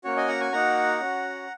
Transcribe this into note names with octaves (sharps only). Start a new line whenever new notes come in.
A#3 C#4 F#4 C#5
D#5 G#5
F#5 A#5
G#5 C#6
A#3 D#4 F#4 F#5 A#5
C#4 F#4